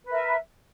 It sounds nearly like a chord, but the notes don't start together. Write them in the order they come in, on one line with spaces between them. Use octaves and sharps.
B4 A#4 E5